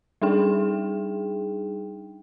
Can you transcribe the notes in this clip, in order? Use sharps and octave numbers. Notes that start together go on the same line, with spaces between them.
G3 D4 D#4 G#4 G5